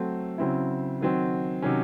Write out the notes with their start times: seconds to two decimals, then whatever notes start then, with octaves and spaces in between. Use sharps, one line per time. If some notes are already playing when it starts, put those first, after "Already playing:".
Already playing: F#3 A3 C4
0.38 C#3 F#3 C4 E4
1.01 D#3 F#3 C4
1.62 C3 D#3 F#3 C#4